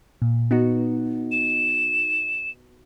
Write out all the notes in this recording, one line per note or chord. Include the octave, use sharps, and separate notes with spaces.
A#2
B3 D#4 F#4
E7